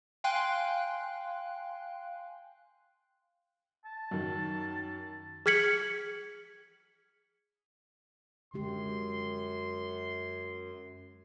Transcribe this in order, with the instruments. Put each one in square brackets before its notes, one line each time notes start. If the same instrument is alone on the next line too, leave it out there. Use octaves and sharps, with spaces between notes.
[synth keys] F5 G5 G#5 C6 F#6
[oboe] A5
[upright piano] F#2 D#3
[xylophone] G#4 F6 G#6 B6 C#7 F#7
[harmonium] F#2 [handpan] D3 G#3 G4 [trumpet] C6